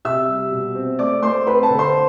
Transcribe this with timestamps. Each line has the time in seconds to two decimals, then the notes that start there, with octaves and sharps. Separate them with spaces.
0.05 C3 E5 E6
0.28 G3
0.52 B2
0.75 C4
0.99 A3 D5 D6
1.22 A3 C5 C6
1.47 C4 B4 B5
1.63 A4 A5
1.70 D3
1.79 C5 C6